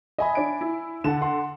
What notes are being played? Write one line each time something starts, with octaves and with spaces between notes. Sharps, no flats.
D#5 E5 G#5 B5
D4 D7
E4
D3 F#5 A5 E7
F#5 C6